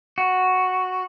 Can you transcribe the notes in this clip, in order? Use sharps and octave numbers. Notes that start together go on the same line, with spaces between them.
F#4